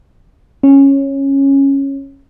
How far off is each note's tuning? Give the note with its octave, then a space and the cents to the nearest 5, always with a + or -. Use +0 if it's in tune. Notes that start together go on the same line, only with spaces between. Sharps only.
C#4 -10